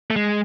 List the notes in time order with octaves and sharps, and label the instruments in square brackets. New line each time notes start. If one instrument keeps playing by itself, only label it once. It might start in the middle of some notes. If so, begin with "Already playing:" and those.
[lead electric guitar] A3
G#3